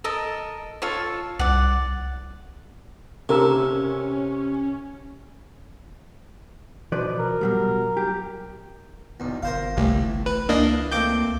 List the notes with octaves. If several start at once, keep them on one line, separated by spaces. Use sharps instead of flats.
A4 A#4 D#5
F4 A4 C#5
C2 D5 F#5
C3 C#4 A4 A#4 E6
B2 F3 B4 D5
A#4
B2 F#3 G3
G4
B1 E2
G1 A#4 C5 F5
C2 A2 E3
B4
C#2 E3 A#3 D4 D#5
A3 A#3 C4 D6 G6